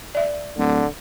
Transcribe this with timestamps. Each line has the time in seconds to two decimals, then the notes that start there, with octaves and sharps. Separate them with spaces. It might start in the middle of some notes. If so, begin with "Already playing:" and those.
0.15 D5 E5
0.58 D1 D3